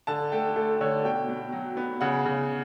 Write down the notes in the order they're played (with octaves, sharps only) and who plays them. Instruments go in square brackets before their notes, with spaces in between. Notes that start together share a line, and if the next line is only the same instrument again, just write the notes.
[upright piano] D3 A5
A3 G5
A3 A4
D3 C#5
B2 G5
B2
F#3
B3
C#3 F#5
C#3